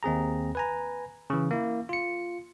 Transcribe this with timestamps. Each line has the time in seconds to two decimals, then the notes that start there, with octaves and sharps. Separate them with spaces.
0.03 D#2 C4 G#4 A#5
0.55 B4 G#5 A#5
1.30 C#3 E3
1.51 A#3 E4
1.89 F4 C#7